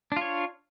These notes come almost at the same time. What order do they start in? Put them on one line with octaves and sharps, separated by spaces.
D4 F4 C#5